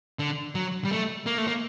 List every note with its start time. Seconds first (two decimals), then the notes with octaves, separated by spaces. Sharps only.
0.19 D3
0.55 F#3
0.84 G3
0.91 A3
1.26 A#3
1.38 A3
1.48 A#3